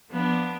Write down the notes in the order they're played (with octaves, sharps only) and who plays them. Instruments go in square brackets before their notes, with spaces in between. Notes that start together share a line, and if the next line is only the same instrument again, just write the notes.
[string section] F3 B3 D4